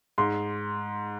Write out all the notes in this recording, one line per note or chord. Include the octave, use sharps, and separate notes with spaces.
G#2 C6